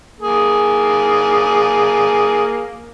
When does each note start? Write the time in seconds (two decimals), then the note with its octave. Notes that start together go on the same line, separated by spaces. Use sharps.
0.20 A#3 G#4